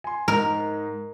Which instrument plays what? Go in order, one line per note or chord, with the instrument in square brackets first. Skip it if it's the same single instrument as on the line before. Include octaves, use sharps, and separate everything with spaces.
[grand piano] G#5 C6
[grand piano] G#2 D#4 [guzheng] A#4